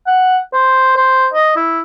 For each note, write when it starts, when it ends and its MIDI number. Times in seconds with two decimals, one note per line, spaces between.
0.07 0.38 78
0.53 0.93 72
0.96 1.27 72
1.33 1.52 75
1.56 1.80 64